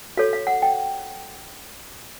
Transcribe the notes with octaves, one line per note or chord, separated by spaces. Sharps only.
F#4 A4 C#5 F5
F5
F#5
G5